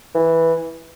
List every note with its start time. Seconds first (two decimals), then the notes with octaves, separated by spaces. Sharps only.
0.14 E3